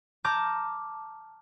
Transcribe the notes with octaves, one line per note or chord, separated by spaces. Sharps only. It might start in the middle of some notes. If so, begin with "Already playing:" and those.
A5 A#5 D6 F6 G6